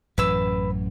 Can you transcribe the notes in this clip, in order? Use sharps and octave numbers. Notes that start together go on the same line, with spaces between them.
A1 F#2 E3 B4 E6